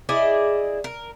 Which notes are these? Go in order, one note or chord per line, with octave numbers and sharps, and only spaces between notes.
E4 G#4 D5 D#5
A#4